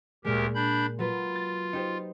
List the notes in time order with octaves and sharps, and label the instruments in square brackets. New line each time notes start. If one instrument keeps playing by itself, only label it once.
[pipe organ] D2 G4 A#4 [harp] A#2 G#3
[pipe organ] D4 B5 G6
[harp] F#3 B4 [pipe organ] F4
[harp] A6
D#4 G4 C5